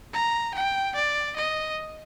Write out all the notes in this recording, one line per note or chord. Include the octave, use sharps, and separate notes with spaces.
A#5
G5
D5
D#5